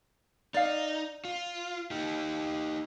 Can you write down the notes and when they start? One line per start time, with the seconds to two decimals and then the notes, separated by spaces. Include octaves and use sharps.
0.54 D#4 D5 F5
1.25 F4
1.91 D#4 G4